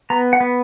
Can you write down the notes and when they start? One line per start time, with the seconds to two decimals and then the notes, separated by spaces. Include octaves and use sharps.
0.10 B3 A#5
0.33 F#5
0.40 B3